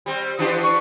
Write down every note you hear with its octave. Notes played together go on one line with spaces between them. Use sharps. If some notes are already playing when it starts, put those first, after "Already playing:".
G3 C4
E3 D4 G4
C#6